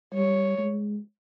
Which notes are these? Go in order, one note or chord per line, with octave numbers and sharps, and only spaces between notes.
G3 C#5
G#3